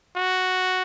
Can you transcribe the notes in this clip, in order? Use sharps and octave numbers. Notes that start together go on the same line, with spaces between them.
F#4